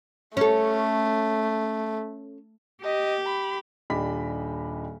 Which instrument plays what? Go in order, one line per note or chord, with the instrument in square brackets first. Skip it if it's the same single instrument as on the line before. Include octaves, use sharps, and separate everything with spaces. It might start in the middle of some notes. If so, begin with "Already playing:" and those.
[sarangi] A3 [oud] C#4 A4
[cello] G4 [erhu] D#5
[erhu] B5
[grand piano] D#1 D4 G4 D#5 B5 B6